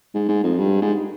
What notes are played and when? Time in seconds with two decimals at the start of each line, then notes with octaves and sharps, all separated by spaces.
0.14 G#2
0.28 G#2
0.44 F2
0.59 G2
0.82 G#2